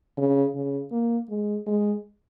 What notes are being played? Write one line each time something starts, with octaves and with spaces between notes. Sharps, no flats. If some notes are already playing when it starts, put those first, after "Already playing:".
C#3
C#3
A#3
G#3
G#3